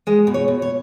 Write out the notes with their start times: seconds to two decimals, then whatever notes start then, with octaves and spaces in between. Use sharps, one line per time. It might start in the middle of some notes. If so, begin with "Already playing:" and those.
0.07 G#3 D#5
0.27 B2
0.34 C#5
0.48 B2
0.62 C#5